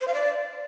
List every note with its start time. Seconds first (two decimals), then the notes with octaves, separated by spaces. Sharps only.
0.01 C5
0.08 F5
0.14 D5